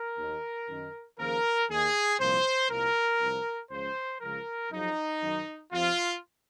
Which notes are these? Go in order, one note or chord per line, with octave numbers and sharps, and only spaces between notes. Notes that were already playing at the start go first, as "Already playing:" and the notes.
Already playing: A#4
D#2 D#3
F#2 D#3
D#2 C#3 F3 A#4
D#2 D#3 G#4
C2 A#2 F3 C5
C2 A#2 F3 A#4
C2 C3 F3
C#2 C#3 F3 C5
C#2 C#3 F3 A#4
F#2 C#3 F3 D#4
F#2 D#3
F2 C3 F3 F4